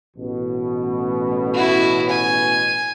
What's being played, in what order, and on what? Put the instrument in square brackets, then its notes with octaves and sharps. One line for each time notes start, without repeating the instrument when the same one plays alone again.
[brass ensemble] A1 B2
[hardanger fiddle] E4 F#4
G#5